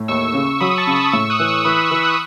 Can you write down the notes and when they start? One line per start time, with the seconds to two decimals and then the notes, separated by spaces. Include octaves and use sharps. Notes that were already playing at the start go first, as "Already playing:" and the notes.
Already playing: A2
0.08 D#2 C#6 E6
0.34 C#3
0.60 F#3 B5 D#6
0.78 A5 C#6
0.87 C#3
0.95 B5 D#6
1.12 A2 C#6 E6
1.30 D#6 F#6
1.40 E3
1.47 C#6 E6
1.65 E3 B5 D#6
1.78 B5 D#6
1.91 E3 C#6 E6
2.04 D#6 F#6